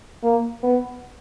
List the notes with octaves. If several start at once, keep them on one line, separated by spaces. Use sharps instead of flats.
A#3
B3